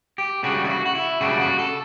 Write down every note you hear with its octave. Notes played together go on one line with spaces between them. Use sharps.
G4
C#3 G3 D4 F#4
E4
F#4
F#4
E4
C#3 G3 D4 F#4
F#4
A4